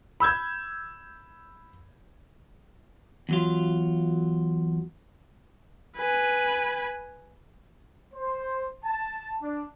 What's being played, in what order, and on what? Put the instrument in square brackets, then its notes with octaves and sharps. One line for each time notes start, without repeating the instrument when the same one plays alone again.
[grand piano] B5 E6 G6 G#6
[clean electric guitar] E2 F#3 F4
[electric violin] B4 G#5
[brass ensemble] C5
A5
D4